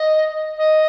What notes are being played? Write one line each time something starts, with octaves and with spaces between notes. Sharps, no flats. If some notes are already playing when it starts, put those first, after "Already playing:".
Already playing: D#5
D#5